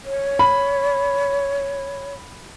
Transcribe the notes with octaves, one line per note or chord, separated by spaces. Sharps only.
C#5
B5